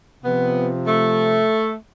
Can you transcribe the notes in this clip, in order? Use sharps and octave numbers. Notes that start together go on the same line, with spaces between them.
C3 F3 B3
A3